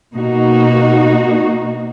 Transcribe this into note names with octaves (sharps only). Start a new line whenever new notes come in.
B2 A#3 D#4 F#4